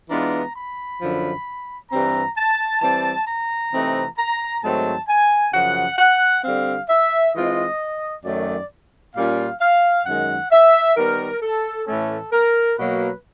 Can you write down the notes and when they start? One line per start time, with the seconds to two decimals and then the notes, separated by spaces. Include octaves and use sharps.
0.11 E3 G#3 B3 D4 F4 A#5
0.56 B5
1.02 F#2 D3 F3
1.91 G2 E3 G3 C4 A#5
2.37 A5
2.82 E3 G3 C4 A5
3.28 A#5
3.73 C3 E3 A3 C4 D#4
4.18 A#5
4.63 G#2 D#3 F#3 A3 C4 A5
5.08 G#5
5.53 F#2 C#3 F3 F#5
5.98 F#5
6.44 D3 G3 C4 F5
6.89 E5
7.35 E3 G#3 C4 F4 D#5
8.25 F#2 D#3 F#3 A3 D5
9.15 A#2 G3 A#3 C#4 F4 F5
9.61 F5
10.06 F#2 D#3 G#3 F#5
10.52 E5
10.97 D#3 G3 B3 A#4
11.42 A4
11.87 A2 E3 A3 C#4 A4
12.33 A#4
12.77 B2 F#3 A#3 B4